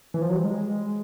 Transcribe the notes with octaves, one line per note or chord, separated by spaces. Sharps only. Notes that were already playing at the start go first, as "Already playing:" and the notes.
E3
F3
F#3
G3
G#3